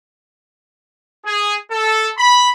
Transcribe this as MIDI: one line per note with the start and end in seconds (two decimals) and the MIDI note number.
1.25 1.55 68
1.70 2.08 69
2.16 2.50 83